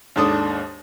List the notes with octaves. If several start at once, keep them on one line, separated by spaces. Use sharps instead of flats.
D#2 G#2 D4 A4 D#6